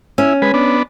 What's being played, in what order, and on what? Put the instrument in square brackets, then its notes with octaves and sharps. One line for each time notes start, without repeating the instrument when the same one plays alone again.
[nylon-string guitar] C#4 [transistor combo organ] E4
[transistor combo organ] G#3 B4
B3 D4